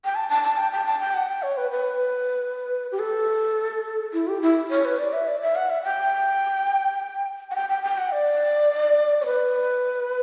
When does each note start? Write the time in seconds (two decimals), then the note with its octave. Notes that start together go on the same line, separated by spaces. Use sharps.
0.05 G5
0.15 A5
0.29 A5
0.43 A5
0.58 G5
0.72 G5
0.86 A5
1.00 G5
1.14 F#5
1.29 G5
1.43 C#5
1.57 B4
1.71 B4
2.92 G4
2.99 A4
4.13 E4
4.28 G4
4.42 E4
4.71 C#5
4.85 B4
4.99 D5
5.13 E5
5.27 D5
5.41 E5
5.56 F#5
5.70 E5
5.84 G5
7.51 F#5
7.55 G5
7.69 G5
7.83 G5
7.98 F#5
8.12 D5
9.21 C#5
9.26 B4